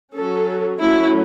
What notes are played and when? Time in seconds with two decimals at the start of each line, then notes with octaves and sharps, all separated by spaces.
0.14 F#3 C#4 A4
0.80 F#3 A3 C#4 E4